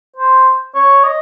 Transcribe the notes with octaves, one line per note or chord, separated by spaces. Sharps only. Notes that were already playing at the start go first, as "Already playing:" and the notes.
C5
C#5
D#5